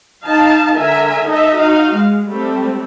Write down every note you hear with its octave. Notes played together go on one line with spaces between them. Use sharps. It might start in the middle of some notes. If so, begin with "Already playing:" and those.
D#4 F5 A5
D3 A#4 E5 G#5
D#4 A4 D#5 E5
D#4 F#4 F5
G#3
G3 A3 C4